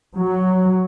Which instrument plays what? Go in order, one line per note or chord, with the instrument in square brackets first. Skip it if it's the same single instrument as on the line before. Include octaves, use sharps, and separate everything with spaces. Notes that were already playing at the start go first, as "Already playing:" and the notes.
[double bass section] F#3